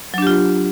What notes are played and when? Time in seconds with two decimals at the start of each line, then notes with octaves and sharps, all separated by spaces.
0.14 F#3
0.18 D4
0.22 G4
0.27 F4